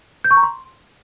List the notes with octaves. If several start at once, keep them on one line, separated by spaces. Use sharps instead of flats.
G6
C#6
A#5
C6